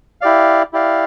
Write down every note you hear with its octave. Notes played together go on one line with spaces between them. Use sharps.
E4 G4 D5 F5
E4 G4 D5 F5